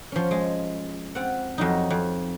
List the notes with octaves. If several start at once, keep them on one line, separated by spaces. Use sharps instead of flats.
F3 C#4
G#3
C4 F4 F#5
F2 F#3 D#4
F2